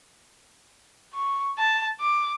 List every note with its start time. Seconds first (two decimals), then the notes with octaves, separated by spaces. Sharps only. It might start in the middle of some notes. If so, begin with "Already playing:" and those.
1.14 C#6
1.59 A5
2.00 D6